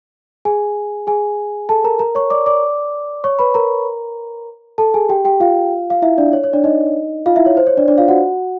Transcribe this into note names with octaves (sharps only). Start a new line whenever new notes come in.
G#4 G#5
G#4 G#5
A4 A5
A#4 A#5
A#4 A#5
C#5 C#6
D5 D6
D5 D6
C#5 C#6
B4 B5
A#4 A#5
A4 A5
G#4 G#5
G4 G5
G4 G5
F4 F5
F5
E4 E5
D4 D5
C#5
C#5
D4 D5
D#4 D#5
F4 F5
E4 E5
C#5
C5
C#5
D4 D5
D4 D5
F4 F5
F#4 F#5